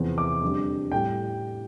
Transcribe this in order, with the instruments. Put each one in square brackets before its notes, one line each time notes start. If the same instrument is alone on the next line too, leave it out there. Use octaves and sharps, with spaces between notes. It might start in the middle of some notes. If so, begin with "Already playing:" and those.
Already playing: [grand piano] E2 C3 F3
D6
F2 D3 G3
A2 G3 G5